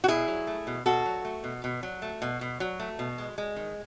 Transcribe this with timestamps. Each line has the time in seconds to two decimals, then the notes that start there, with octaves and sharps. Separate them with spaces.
0.04 F#4
0.08 B2 E4 G#4
0.28 F#3
0.47 A3
0.67 B2
0.86 B2 F#4 A4
1.06 F#3
1.25 A3
1.44 B2
1.64 B2
1.83 F#3
2.02 A3
2.22 B2
2.41 B2
2.60 F#3
2.80 A3
2.99 B2
3.18 G#3
3.38 G#3
3.56 D#3